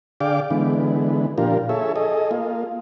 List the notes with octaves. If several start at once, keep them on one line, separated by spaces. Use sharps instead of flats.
D3 G#4 D5 F5 G5 D6
D3 E3 G#3 B3
A#2 F3 D4 F4 G4 A#4
G#4 A4 C#5 E5
G#4 A4 D#5
A#3 F4